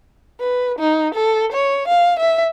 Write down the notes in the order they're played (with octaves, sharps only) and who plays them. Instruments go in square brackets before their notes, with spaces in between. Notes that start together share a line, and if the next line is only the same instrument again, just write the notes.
[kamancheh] B4
D#4
A4
C#5
F5
E5